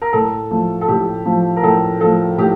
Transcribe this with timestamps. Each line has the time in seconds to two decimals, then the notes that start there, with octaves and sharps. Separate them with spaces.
0.02 A#4
0.13 A2 A4
0.51 F3 A3
0.81 A4
0.88 A2 G4
1.26 F3 A3
1.56 A#4
1.63 A2 A4
2.01 F3 A3 A4
2.38 A2 G4